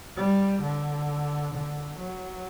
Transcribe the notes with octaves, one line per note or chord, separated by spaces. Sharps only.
G3
D3
D3
F#3